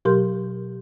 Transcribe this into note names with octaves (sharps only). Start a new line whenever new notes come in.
B2 F#3 G4 A#4 C6 G6